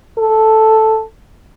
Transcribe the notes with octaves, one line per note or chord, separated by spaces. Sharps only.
A4